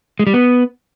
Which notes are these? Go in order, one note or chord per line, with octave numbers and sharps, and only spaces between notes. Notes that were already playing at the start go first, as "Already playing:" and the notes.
G#3
G3
B3